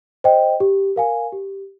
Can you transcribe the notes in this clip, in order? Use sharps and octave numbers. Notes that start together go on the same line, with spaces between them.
C5 D#5 G5
G4
A#4 F5 G#5
G4